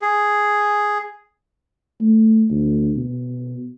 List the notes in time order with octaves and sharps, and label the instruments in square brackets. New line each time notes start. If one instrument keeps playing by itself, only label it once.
[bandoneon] G#4
[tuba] A3
D2
B2